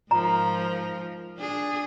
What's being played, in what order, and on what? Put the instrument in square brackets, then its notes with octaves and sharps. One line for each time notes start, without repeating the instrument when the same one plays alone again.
[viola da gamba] G#2 F3 A#4 [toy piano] A#5
[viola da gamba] D4 G#4